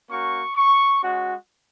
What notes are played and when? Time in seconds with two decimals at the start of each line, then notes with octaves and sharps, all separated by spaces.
0.10 A#3 C#4 F#4 C#6
0.56 C#6
1.02 G#3 C#4 F#4